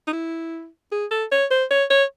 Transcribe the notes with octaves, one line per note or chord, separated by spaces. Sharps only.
D#4
E4
G#4
A4
C#5
C5
C#5
C#5